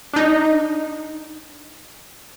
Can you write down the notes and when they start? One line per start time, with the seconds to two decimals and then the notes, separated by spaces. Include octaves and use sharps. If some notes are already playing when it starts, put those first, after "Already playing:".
0.14 D4 D#4